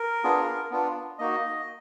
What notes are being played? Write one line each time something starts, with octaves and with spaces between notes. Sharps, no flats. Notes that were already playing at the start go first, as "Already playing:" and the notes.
Already playing: A#4
B3 D4 F4 G#4
B3 D4 F4
A#3 D#4 F#4 D#5